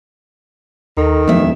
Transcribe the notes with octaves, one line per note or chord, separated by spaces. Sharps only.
D#2 D#3 A4 A#5
E1 F2 F#3 A3 A#3 E5